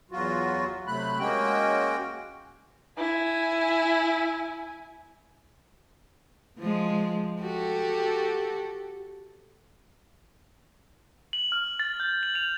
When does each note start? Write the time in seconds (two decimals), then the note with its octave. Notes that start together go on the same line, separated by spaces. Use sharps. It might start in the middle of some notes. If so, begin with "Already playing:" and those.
0.12 E2 F#3 F4 F#4
0.87 C3 F#3 A3 B5 F#6
1.19 G#3 A#3 C#4 F#4 G5
2.97 E4 G#5
6.59 F3 G#3
7.40 F#4 G4 A4
11.33 F#7
11.52 F6
11.79 A6
12.00 G6
12.23 F#7
12.35 F7